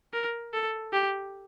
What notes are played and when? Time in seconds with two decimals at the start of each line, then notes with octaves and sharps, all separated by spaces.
0.13 A#4
0.53 A4
0.93 G4